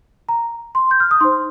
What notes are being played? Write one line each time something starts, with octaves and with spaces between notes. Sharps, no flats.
A#5
C6
G6
F6
D#6
D#4 C5 C6